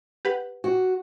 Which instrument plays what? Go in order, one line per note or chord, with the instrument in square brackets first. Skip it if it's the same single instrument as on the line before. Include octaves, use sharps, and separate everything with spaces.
[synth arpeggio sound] G4 B4 F#5
[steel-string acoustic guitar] F#4